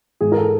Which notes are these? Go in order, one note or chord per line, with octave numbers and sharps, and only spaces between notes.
G#2 G#4
A#4
A4